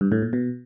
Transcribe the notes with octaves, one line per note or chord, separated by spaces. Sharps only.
G2
A2
A#2
B2